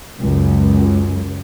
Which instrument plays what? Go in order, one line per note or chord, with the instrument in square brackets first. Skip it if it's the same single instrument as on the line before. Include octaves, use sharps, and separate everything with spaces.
[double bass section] C#2 F#2